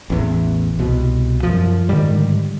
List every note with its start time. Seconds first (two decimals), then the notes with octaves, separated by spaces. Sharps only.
0.10 A1 E2
0.79 C2 B2
1.43 F#2 F3
1.89 G#2 D3 D#3 G3